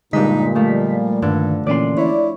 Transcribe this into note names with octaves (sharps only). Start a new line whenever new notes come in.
G2 A#2 D3 G#3 D#4 D#5 B6
F3 G3 A3
G2 D3 D#3
A#2 E3 A#3 C#4 D5 C6
E4 C#5 D5